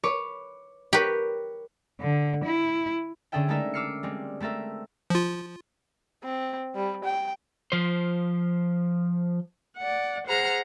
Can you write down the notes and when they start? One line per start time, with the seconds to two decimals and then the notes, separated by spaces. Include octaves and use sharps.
0.04 B4 C#5 D6
0.93 G4 A#4 B4 C#5
2.00 D3
2.44 E4
3.32 D3 C#4 G#4 A4 E5 G5
3.48 G#3 A3 D#4 A4 A#4 E5
3.74 D6 E6 F6 C7 C#7
4.03 G3 G#3 C4
4.40 A3 C4 A4 A#4 E5
5.10 F3 F4
6.24 C4
6.75 G3
7.04 G5
7.72 F3 C5
9.78 D5 F#5
10.26 G#4 C5 F#5 A#5 F6